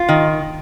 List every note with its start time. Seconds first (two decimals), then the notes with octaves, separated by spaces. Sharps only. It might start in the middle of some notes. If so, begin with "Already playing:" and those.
Already playing: F4
0.09 D#3